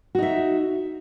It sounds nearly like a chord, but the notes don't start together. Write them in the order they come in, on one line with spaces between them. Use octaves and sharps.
F#4 D#4 E5